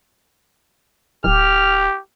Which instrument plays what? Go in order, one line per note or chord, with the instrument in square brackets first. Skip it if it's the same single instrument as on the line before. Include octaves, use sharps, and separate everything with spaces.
[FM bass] D1 [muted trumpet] G4 [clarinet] F6